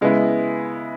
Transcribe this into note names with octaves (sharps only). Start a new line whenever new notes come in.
C#3 G#3 B3 E4